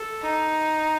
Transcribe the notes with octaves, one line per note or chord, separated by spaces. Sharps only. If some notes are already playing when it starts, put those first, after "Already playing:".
Already playing: A4
D#4